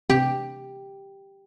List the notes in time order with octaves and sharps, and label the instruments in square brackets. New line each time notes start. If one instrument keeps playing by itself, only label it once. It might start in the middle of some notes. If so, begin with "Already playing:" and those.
[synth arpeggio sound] C3 [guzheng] G4